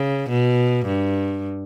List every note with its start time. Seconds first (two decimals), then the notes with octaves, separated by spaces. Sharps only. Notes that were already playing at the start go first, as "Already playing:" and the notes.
Already playing: C#3
0.29 B2
0.86 G2